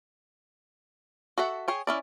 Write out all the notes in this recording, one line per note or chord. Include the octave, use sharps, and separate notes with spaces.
F#4 A4 E5 F#5
G#4 C#5 G5
C#4 E4 D5